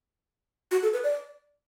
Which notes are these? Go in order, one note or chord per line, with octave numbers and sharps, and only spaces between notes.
F#4
A4
B4
D5